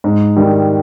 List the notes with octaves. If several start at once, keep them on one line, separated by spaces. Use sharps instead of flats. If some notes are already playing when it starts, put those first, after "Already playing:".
G#2
D#3 G3